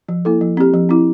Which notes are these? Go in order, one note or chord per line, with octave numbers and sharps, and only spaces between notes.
F3
A#3 E4 A4
F3
C4 G4
F3
C4 E4